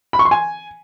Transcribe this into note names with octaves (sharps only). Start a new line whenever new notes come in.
B5
C#6
C6
G#5